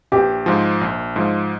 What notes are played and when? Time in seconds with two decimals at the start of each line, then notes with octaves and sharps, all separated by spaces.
0.12 A#1 G4
0.46 G#2 F3
0.81 A#1
1.16 G#2 F3